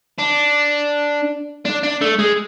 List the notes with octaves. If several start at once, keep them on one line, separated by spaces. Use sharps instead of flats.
D4
D4
D4
A3
G#3